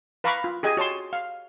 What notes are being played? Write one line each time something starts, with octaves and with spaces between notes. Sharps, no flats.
B4 F5 A#5 B5 C#6 D6
F4
G4 G#4 D#5 G#5
F#4 C#5 A5 C6
F5